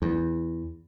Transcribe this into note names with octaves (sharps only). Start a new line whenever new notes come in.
E2